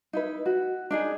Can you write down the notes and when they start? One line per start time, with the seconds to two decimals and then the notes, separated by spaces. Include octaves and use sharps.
0.13 D#4 E4 B4
0.46 F#4
0.91 D4 D#4 G#4